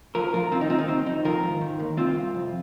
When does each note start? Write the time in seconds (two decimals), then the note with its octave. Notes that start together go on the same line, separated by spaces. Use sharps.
0.15 F3 F4 A#4
0.33 F2 F4 A#4
0.51 D#3 C4 F4
0.61 D#4
0.69 D#2 C4 F4
0.78 D#4
0.88 D#3 C4
1.06 F2 D#4
1.25 D#3 F4 A#4
1.43 G#2
1.61 D#3
1.80 D#2
1.97 C2 C4 F4
2.16 C2
2.34 F2